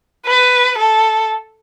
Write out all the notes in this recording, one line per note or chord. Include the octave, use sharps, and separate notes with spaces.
B4
A4